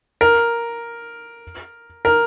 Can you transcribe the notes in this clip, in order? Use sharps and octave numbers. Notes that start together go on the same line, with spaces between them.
A#4
A#4